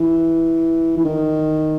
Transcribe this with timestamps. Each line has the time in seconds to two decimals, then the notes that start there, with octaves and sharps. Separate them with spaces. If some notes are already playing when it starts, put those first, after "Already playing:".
Already playing: E3
0.97 E3
1.05 D#3